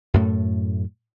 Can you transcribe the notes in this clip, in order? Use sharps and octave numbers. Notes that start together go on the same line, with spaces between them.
F#2 A2 A3